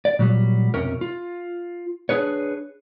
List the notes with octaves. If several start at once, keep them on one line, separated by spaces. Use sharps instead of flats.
D5
A#2 F#3 G3
B1 F2 C3 C#4 A#4
F4
D4 G#4 B4 C#5